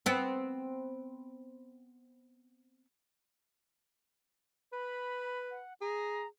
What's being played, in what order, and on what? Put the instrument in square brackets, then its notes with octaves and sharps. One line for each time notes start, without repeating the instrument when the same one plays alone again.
[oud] B3 C4
[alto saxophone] B4 [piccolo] B5
[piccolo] F#5
[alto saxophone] G#4 [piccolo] A#5